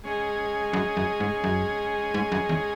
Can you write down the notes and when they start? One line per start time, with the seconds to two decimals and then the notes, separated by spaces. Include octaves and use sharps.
0.04 G#3 C#4 G#4 D#5
0.73 F#2
0.97 F#2
1.20 G#2
1.44 F#2
2.14 G#2
2.32 F#2
2.49 E2